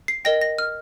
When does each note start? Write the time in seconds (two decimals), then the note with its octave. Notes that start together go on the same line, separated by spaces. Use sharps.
0.08 C7
0.25 A#4 D#5 G5 A#6
0.41 A#6
0.58 F6